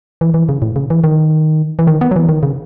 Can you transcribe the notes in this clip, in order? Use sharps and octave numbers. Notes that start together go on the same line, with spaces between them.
E3
E3
C#3
A2
C#3
E3
D#3
E3
D#3
B3
F#3
E3
D#3
C#3